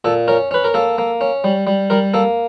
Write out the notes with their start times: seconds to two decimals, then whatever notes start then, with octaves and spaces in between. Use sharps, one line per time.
0.05 A#2 A4
0.28 C#4 A#4
0.51 C#4 B4
0.64 A#4
0.74 A#3 A4
0.98 A#3
1.21 C#4
1.44 G3
1.67 G3
1.90 G3 A#4
2.14 A#3 A4